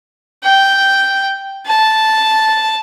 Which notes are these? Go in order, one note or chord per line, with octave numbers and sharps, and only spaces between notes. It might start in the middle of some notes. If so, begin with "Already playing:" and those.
G5
A5